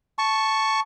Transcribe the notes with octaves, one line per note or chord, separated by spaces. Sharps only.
A5 C#6